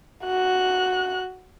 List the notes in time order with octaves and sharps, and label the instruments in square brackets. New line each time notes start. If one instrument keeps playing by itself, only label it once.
[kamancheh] F#4 F#6